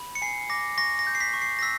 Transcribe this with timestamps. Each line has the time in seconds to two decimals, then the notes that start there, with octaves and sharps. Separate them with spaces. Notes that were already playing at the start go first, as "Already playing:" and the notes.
Already playing: B5
0.15 C#7
0.22 G#5 C7
0.50 D6 A#6
0.78 C#6 A#6
0.99 A#6
1.07 G6
1.15 C7
1.21 B6
1.34 C#6
1.42 C7
1.59 A#6
1.62 E6 B6